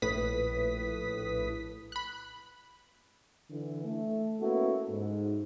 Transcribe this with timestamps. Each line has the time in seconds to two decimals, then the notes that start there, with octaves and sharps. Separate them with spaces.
0.02 A#1 A2 B4 D#6 B6
1.92 B5 F#6
3.50 D3 E3
3.84 A3
4.40 A#3 B3 C#4 E4 F#4 A4
4.90 G#2